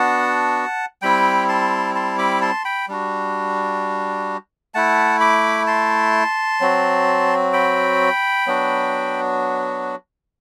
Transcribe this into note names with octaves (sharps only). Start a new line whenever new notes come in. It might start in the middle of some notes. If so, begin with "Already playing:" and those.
Already playing: B3 D4 F#4 F#5 A5
G3 C4 E4 G5 B5
A5 C6
A5 C6
B5 D6
A5 C6
G5 B5
G3 D4 F#4
A3 E4 F#5 A5
B5 D6
A5 C6
F#3 C4 F#4
G5 B5
F#3 B3 D4 F#4